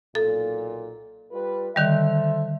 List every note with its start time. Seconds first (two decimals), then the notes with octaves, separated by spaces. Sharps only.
0.15 B1 A#2 A4
1.32 G3 F4 B4
1.76 D3 D#3 G3 A4 C5 E5